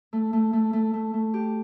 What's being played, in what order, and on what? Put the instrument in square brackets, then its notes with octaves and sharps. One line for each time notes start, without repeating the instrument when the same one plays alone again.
[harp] A3
A3
A3
A3
A3
A3
G4